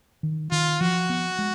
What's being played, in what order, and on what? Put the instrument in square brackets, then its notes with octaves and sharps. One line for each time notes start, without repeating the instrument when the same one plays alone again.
[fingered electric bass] D#3
[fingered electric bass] D#3 [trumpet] F4
[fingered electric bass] F3 [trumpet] F#4
[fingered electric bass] B3
G#3